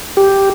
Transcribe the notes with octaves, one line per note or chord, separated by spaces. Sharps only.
G4